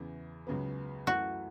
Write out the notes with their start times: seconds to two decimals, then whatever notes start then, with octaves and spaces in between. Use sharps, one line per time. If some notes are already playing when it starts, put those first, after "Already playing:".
Already playing: E2 C#3 E3
0.47 C#2 C#3 F#3 B3
1.07 F#2 E3 A3 E4 F#4